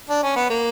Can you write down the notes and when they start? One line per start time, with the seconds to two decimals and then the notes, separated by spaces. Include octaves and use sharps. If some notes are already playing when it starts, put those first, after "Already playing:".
0.10 D4
0.23 C#4
0.36 B3
0.50 A#3